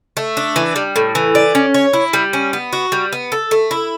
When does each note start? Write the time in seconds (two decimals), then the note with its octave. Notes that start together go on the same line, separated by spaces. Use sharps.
0.17 A3
0.37 D4
0.56 E3
0.76 G3
0.96 A2
1.15 E3
1.35 D5
1.55 C#4
1.74 C#5
1.93 E4
2.13 G3
2.33 C#4
2.53 B3
2.73 F#4
2.92 G3
3.13 B3
3.32 A4
3.51 A3
3.71 E4